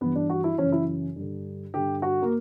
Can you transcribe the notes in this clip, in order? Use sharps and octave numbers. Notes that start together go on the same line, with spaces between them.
G2 E3 B3
D4
F#4
E4
F#2 C#3 E3 C#4
E4
G2 D3
G2 D3 G4
F#4
A#3